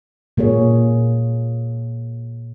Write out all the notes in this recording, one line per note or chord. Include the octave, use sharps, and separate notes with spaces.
A#2 A#3 G#4 C#5